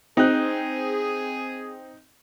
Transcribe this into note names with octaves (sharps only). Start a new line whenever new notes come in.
C4 D#4 G#4 F#6